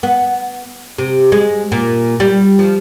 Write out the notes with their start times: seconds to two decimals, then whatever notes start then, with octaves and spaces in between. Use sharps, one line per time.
0.03 B3
0.98 C3
1.32 G#3
1.72 A#2
2.20 G3
2.59 F3